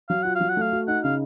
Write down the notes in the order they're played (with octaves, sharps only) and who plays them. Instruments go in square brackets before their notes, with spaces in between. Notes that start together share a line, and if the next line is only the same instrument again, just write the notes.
[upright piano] F#3 [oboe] F5
[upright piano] F4 [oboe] F#5
[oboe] F5
[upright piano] F#3
[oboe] F#5
[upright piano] A3 [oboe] F5
[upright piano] F#4
[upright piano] D#4 [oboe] F#5
[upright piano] C#3 [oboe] F5